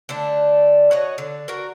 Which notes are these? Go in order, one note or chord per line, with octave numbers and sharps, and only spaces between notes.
D3 A3 D4
F#4 C#5 D#5
D3
F#4 A#4